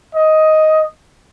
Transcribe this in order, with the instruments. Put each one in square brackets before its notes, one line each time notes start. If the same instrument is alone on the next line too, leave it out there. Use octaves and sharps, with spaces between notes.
[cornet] D#5